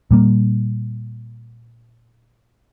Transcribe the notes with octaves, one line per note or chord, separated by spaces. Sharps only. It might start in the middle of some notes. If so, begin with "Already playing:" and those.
A#2 G3 A#3